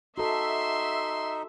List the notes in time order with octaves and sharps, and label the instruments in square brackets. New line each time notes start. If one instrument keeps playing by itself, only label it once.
[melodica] D#4 [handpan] F#4 A4 [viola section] E5 [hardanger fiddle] C6